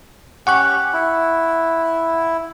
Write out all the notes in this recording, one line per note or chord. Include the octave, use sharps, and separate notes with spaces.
C#4 G4 F#5 C#6 F#6
E4